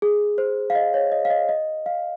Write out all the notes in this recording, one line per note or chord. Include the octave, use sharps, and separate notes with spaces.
G#4
C5
F5
D#5
C#5
D#5
F5
D#5
D#5
F5